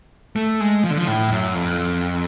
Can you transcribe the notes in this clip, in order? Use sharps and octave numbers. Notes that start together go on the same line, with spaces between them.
A3
G#3
F3
D3
F3
A2
F#2
F2